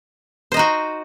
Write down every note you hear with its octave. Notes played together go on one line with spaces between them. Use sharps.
D#4 F#4 C5 D#5